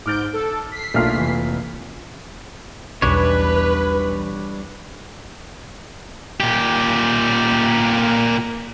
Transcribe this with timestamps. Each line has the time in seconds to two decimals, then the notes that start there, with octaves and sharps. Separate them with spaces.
0.06 G#2 D6 F6 G6 A6 D7
0.33 A4
0.72 B6 C7
0.94 B1 A3 A#3 D4 F4 F6
1.14 F1 E3
3.02 B1 E2 G3 D4 B4 C#5
6.40 A#2 G4